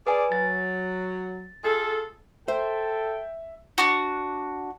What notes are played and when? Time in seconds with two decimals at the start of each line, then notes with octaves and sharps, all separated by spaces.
0.07 G#4 B4 D5 G#5
0.32 F#3 A6
1.64 F4 G#4 A4
2.48 A4 C5 E5 G5
3.78 D4 F#4